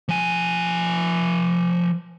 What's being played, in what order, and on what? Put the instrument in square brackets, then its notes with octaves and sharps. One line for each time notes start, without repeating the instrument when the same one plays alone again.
[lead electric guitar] F3 G#5